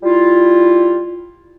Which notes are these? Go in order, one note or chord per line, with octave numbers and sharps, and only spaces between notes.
G3 E4 F4